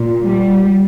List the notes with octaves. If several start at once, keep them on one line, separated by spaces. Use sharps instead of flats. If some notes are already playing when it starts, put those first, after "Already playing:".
Already playing: A#2
G3